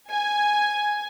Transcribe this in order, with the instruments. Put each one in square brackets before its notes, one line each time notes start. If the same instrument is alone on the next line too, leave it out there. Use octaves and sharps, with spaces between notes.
[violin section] G#5